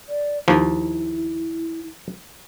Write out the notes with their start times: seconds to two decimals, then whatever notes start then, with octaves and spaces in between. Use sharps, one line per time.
0.09 D5
0.48 D#2 F3 E4